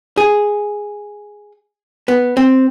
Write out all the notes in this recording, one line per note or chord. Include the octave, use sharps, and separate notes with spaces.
G#4
B3
C4